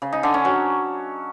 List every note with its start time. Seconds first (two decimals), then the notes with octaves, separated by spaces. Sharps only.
0.02 C#3
0.13 D#4
0.23 D3
0.34 C#4
0.45 F#3